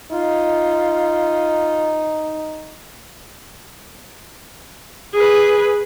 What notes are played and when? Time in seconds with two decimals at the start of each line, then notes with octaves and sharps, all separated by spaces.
0.11 D#4 F4
5.13 G#4 B4